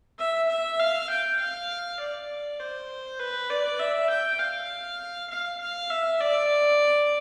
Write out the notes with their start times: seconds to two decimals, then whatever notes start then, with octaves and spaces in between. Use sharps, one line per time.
0.19 E5
0.49 E5
0.79 F5
1.10 G5
1.39 F5
2.00 D5
2.59 C5
3.19 B4
3.50 D5
3.79 E5
4.10 G5
4.39 F5
5.30 F5
5.60 F5
5.90 E5
6.20 D5